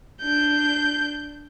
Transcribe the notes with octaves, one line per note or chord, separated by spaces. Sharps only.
D4 G6